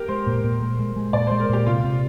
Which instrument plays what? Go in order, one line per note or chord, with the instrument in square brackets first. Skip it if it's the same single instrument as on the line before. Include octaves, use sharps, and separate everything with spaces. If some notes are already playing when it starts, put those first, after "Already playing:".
Already playing: [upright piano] G4 A#4
[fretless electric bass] G#3 [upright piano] C5
[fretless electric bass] A#2
A#2
G#3
G#3
G#3
[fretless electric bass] A#2 [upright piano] D5
[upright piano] C5
[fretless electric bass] G#3
[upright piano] A#4
[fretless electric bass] A#2 [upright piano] G4
[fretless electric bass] C3 [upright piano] F4
[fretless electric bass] C3